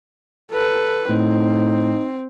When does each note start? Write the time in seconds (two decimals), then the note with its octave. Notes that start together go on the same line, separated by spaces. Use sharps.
0.52 A4 B4
1.09 A2 C4 D#4